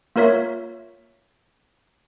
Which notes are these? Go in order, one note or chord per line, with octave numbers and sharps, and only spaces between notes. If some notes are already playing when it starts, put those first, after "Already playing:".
A#3 F4 A#4 C#5 E5